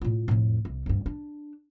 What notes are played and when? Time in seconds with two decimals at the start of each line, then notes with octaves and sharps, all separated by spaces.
0.02 A2 F4
0.28 F2 A2
0.65 C2
0.86 D2 G2
1.06 D4